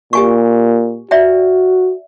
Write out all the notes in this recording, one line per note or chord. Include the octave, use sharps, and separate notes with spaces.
A#2 G4 G#5 C#6
F#4 D5 E5 G5